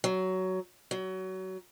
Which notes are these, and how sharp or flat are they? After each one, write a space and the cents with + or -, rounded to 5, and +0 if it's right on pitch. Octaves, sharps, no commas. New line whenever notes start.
F#3 +15
F#3 +25